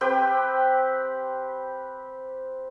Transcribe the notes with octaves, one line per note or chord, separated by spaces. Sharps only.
C4 G4 B4 G5